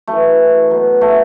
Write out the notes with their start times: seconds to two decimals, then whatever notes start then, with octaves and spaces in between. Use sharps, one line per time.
0.07 F#2 E3 A3
0.71 B2 F#3
1.01 A3